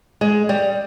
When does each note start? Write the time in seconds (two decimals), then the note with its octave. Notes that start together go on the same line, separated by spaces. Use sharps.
0.21 G#3
0.49 G3